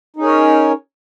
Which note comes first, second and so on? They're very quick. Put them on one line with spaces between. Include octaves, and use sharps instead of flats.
D#4 C#4 G#4 A#4 C#5